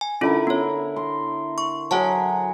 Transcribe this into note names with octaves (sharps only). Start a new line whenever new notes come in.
G#5
D3 C#4 E4 F4 A#4
B3 C#5
C6
C#6
F#3 G#4 C#5 F#5 A5